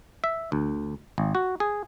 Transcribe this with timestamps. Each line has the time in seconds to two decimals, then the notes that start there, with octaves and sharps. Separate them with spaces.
0.24 E5
0.52 D2
1.18 G#1
1.35 F#4
1.60 G#4